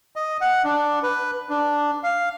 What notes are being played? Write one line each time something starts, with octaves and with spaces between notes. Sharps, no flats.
D#5
F#5
D4
B4
D4
F5